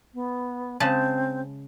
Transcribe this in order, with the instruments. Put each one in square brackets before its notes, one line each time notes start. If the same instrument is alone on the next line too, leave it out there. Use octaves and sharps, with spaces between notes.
[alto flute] B3
[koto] C#3 G#3 A5 [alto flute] C4